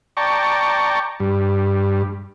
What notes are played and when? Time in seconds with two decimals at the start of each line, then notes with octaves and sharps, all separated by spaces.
0.17 D5 G5 A5 A#5 C#6
1.20 G2